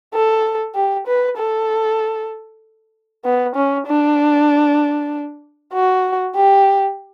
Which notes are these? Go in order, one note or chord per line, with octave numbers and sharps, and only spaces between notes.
A4
G4
B4
A4
B3
C#4
D4
F#4
G4